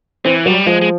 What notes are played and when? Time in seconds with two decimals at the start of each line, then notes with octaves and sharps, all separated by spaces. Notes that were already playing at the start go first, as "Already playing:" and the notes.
0.25 E3 C4
0.46 F#3 G3
0.67 F3 G#3
0.81 G#3